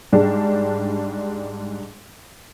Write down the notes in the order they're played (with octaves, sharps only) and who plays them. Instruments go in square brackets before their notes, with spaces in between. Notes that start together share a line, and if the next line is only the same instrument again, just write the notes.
[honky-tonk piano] G#2 G3 G#3 D4